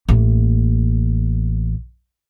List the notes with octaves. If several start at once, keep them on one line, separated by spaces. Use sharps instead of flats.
A1 A#3